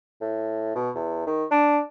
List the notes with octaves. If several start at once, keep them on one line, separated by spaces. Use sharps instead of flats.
A2
B2
E2
D#3
D4